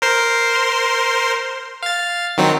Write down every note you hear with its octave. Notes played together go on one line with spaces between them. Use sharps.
A#4 C5 C6
F5 A6
D#3 F#3 C4